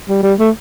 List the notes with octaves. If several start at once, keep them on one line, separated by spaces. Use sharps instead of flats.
G3
G3
A3